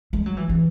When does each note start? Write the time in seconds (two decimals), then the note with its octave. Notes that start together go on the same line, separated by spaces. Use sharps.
0.13 G#3
0.26 F#3
0.37 E3
0.49 E3